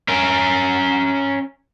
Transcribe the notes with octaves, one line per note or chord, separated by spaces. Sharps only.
C#4 A#4